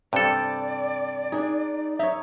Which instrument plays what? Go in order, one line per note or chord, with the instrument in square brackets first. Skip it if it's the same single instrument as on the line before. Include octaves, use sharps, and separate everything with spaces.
[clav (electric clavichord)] G2 A4 [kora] C3 G5 [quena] D5
[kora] D4 G#4 [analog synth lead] D#4
[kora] D#4 C#5 [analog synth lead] E5